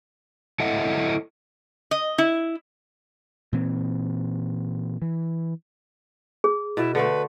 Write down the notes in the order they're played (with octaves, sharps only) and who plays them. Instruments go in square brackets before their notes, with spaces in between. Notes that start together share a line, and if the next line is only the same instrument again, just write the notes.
[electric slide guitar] E4 A4 D#5 E5 F#5
[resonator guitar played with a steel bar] D#5
E4
[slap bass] A#2 E3 C4
E3
[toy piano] G#4
[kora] B2 [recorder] E4
[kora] D3 A3 [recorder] B4